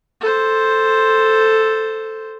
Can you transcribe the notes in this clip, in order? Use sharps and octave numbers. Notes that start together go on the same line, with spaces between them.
A4 C5